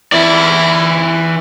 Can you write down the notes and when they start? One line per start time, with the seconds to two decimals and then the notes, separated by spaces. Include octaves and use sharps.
0.12 E3 E4 D5